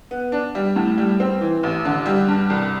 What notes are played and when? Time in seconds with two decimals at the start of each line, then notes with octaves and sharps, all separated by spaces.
0.11 B3
0.32 D4
0.55 G3
0.76 A2
0.98 G3
1.20 C4
1.41 E3
1.63 A1
1.85 D3
2.06 G3
2.28 G2
2.50 C2